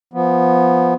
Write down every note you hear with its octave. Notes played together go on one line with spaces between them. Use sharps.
F3 B3